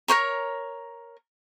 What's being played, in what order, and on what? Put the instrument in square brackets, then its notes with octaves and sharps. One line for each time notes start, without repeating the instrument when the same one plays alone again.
[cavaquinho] A#4 C5 C#5 A#5